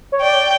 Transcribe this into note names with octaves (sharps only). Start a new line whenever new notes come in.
C#5
D5 G5